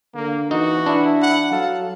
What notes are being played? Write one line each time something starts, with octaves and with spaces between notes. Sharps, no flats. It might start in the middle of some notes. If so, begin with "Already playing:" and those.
D3 A#3
E3 D#4 F#4
D4 E4
F#5
F#3 A4 F5